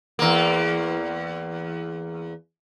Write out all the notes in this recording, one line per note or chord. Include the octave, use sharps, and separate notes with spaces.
E2 A#3